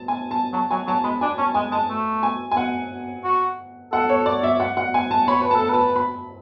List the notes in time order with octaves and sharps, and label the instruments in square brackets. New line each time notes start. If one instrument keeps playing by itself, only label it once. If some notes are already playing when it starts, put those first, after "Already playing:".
Already playing: [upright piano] A5
G#5
A5
[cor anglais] F#3 [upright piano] A5
[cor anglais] F#3 [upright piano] G#5
[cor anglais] F#3 [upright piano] A5
[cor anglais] G#3 [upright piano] B5
[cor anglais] D4 [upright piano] G#5
[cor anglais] C#4 [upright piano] A5
[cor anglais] G#3 [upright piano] G#5
[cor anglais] G#3 [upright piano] A5
[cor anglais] A3
[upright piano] G#5
G#5
F#5
[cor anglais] F#4
[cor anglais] A4 [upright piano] F#5
[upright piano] C#5
D5
E5
F#5
F#5
G#5
A5
[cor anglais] C#5 [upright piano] B5
[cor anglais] B4
[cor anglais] A4 [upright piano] A5
[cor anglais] B4 [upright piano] A5
[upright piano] B5